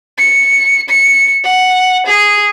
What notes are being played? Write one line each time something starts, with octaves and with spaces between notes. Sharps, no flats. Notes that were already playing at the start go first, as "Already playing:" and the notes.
C#7
C#7
F#5
G#4